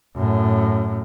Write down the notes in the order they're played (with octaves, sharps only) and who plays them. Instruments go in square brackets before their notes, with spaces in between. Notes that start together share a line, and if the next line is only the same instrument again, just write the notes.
[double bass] F#2 A2